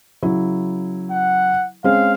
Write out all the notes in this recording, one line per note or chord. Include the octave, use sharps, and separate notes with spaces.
C#3 F#3 E4
F#5
G#3 C4 C#4 F5